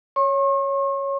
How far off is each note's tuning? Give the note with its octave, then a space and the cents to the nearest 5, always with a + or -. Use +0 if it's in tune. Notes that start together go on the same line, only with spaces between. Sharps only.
C#5 +0 C#6 -45